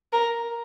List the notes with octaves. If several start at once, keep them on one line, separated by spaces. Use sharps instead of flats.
A#4